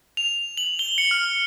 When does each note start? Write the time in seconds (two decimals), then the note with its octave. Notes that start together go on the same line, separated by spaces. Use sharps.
0.17 F7
0.57 F#7
0.79 G7
0.98 C#7
1.11 F6